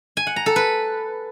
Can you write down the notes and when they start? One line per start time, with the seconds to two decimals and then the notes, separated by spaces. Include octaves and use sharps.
0.17 G#5
0.27 F#5
0.36 A#5
0.46 A4
0.56 B4